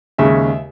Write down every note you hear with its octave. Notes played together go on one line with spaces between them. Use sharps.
D#2 C#3 G#3 E5